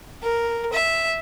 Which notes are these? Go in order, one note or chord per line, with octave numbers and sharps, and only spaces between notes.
A#4
E5